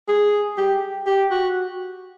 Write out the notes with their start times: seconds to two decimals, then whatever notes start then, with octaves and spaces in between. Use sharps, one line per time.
0.08 G#4
0.58 G4
1.07 G4
1.31 F#4